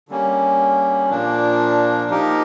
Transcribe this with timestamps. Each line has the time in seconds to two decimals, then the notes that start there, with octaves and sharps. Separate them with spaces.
0.08 D3 G3 A#3 C#4
1.09 A#2 F3 A#3 D4
2.10 F3 A#3 D#4 G4 A#4